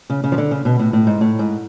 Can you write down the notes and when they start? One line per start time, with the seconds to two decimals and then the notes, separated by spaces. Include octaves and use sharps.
0.10 C#3
0.24 C#3
0.32 F3
0.38 D3
0.51 C#3
0.65 B2
0.79 A2
0.93 A2
1.07 G#2
1.21 A2
1.39 G#2